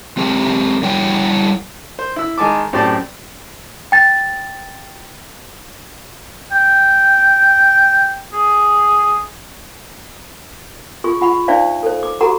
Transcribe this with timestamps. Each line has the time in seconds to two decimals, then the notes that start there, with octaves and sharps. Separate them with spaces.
0.17 G#3 C4 G4 A#4
0.83 G3 E4 C#5 F#5 G5
1.99 C5
2.16 E4 E6
2.38 D#3 G#3 G#5 A5 D6
2.73 F#2 A2 C4 G4 D5 A5
3.92 G5 A6
6.52 G5
8.34 G#4
11.04 F4 G#4 C#6
11.21 F4 F#5 B5 C#6
11.48 D4 D#4 C5 D5 E5 F5
11.83 A4 C5
12.03 D6
12.21 F#4 G4 A4 F#5 A#5 C#6